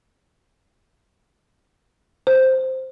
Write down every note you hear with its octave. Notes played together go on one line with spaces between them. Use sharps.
C5